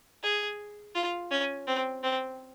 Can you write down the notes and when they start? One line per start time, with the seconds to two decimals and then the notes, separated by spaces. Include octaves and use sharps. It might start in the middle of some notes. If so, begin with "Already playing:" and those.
0.23 G#4
0.95 F4
1.31 C#4
1.67 C4
2.03 C4